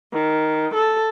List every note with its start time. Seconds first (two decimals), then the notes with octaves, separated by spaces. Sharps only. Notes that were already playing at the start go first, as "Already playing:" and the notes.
0.13 D#3
0.74 A4